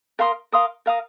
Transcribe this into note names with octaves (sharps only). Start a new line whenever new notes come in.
A#4 F5 C6 D#6
A#4 F5 C6 D#6
A#4 F5 A#5 D#6